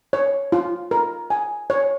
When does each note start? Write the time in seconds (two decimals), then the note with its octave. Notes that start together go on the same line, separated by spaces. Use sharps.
0.13 C#5
0.52 F4
0.91 A#4
1.30 G#5
1.70 C#5